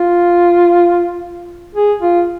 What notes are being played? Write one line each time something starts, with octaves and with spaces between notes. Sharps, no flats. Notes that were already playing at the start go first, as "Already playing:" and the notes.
Already playing: F4
G#4
F4